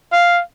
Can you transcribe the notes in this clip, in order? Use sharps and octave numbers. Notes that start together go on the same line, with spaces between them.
F5